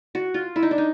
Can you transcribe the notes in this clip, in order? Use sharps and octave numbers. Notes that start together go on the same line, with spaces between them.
F#4
F4
E4
D#4
D4
D#4